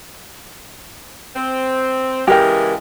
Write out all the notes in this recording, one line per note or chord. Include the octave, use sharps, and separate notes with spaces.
C4
C#3 E3 G#3 G4 A#4 G5